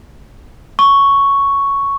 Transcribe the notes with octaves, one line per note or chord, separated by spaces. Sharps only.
C#6